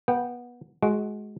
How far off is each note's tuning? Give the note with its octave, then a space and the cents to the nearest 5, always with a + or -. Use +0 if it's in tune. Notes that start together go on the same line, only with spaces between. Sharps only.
B3 -20 G5 +0
G#3 +15 F#4 +0